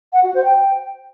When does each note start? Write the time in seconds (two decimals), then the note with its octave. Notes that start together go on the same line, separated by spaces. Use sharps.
0.13 F#5
0.24 F#4
0.34 C5
0.45 G5